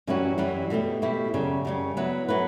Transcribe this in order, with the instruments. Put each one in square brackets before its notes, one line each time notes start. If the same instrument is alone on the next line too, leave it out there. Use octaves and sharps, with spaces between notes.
[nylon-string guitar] F#2 E3 G3 C#4 F#4
F#2 E3 G3 C#4 F#4
B2 A3 E4 G4
B2 A3 E4 G4
F#2 C#3 G3
F#2 C#3 G3
F#3 B3 E4 B4
F#3 B3 E4 B4